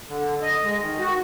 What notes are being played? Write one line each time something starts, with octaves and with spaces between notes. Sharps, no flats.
D3
D#5
G#3
D#3
F#4